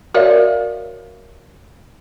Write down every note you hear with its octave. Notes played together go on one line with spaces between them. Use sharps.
F#4 A#4 C#5 D5 E5 F5